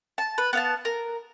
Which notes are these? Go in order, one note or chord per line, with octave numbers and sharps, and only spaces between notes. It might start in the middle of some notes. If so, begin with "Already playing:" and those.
A5
B4
B3 F5 A5
A#4